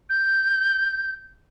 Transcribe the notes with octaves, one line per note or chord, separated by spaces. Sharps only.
G6